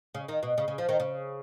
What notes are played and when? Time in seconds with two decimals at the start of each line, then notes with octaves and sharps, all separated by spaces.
0.15 C#3
0.29 D#3
0.43 B2
0.58 C#3
0.68 C#3
0.78 F3
0.89 D#3
1.00 C#3